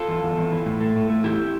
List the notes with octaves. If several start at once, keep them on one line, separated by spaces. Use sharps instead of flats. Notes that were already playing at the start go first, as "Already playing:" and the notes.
Already playing: F4 A4
E2
E2
E2
E3
A2
A3
A2
A3
E2 E4 G4